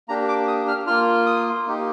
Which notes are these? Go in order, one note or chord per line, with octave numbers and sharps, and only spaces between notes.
A#3 D4 G4 A#5
D6
D#6
F6
A#3 F4 F6
D#6
A#3 D#4 G4